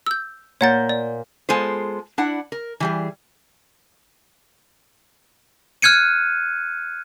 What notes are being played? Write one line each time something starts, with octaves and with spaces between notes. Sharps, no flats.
E6 G6
A#2 C#5 F#5 A#5 G6 A6
D5
G#3 B3 F4 A4 C5
D4 E4 F#5
A#4
E3 G3 G#4
F6 F#6 G#6 C#7 D#7